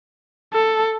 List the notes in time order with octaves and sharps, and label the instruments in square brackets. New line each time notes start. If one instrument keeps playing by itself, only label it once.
[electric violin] A4